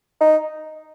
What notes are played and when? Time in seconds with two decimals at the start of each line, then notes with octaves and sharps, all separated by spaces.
0.21 D#4